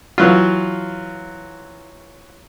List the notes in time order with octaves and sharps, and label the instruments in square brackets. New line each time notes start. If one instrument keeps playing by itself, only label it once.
[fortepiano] E3 F#3 F4